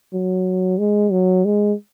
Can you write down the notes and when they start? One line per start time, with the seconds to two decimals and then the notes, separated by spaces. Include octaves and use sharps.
0.14 F#3
0.79 G#3
1.12 F#3
1.45 G#3